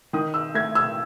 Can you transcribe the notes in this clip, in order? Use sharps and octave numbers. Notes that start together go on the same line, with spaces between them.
D#3 D#6
E6
A3 G#6
E6